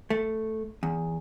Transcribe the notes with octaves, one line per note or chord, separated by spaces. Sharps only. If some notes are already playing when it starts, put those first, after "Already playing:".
A3
E2